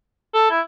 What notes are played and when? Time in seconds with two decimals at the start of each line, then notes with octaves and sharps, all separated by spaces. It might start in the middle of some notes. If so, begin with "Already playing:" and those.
0.34 A4
0.51 E4